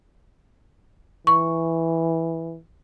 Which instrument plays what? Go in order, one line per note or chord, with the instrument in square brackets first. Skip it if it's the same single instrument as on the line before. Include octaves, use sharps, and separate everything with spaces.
[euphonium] E3 [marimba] C#6